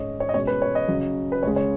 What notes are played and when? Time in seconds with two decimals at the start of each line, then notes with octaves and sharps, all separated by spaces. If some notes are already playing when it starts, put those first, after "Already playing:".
Already playing: G#2 G#3 C#4 C#5 D#5
0.20 C#5
0.29 D#5
0.33 B2 G#3 C#4 C#5
0.47 B4
0.62 C#5
0.75 D#5
0.88 C#3 F#3 C#4
1.32 B4
1.43 C#2 C#3 G#3 C#5
1.56 C#5